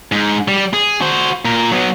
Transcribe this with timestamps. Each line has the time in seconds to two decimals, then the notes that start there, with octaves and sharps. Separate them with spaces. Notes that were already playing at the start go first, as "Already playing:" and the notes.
0.12 G#2
0.48 G3
0.73 G#4
1.01 F#4 C5
1.45 A#2 A#4
1.72 F#3 B3